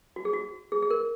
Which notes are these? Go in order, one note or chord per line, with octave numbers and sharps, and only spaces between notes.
F#4
G#4
F#4
G#4
G#4
A#4